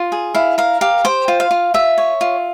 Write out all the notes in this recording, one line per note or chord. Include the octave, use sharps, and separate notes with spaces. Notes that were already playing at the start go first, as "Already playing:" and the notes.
Already playing: F4
G#4
E4 F5
A#4 F5
G4 F5
C5 G5
F4
F5
F4
F4 E5
C#5
F4